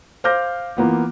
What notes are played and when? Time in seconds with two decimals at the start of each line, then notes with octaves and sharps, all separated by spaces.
0.24 C5 F5 D6 F6 G6 A#6
0.77 E3 A#3 B3 F4